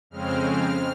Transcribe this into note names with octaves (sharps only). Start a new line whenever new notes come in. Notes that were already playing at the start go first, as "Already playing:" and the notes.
F2 C#3 G#3 C4 F6
F6